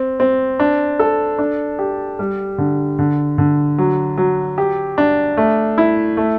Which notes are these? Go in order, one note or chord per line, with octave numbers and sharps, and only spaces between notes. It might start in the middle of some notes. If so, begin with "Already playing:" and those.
Already playing: C4
C4
D4
A4
D4
G4
G3
D3
D3
D3
F#3
F#3
G4
D4
A3
E4
A3